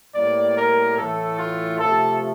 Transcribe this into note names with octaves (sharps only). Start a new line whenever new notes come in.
A2 G3 A#3 D5
A#4
A2 E3 A3 A4
F4
C3 F3 A3 A4